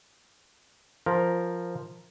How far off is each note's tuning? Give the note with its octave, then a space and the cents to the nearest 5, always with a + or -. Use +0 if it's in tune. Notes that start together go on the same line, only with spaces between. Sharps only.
F3 +0 A#4 +0